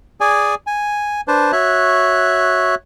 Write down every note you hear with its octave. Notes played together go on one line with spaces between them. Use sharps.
G#4 D5 G#5
G#5
D4 B4 C5 A5
F#4 C#5 E5 F#6